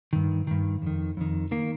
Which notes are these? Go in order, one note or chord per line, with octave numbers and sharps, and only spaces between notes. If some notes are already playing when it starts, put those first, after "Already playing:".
G2 D#3
G2 D#3
F2 D#3
F2 D#3
D#3 A#3